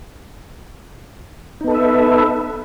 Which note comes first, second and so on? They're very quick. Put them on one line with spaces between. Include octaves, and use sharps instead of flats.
D#4 B3 A4 B4 E5